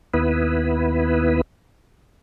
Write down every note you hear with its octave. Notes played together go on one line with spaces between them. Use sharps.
D#2 B3 E4 B4